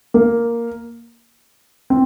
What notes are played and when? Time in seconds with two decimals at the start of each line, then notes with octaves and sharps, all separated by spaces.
0.14 A#3
1.90 C4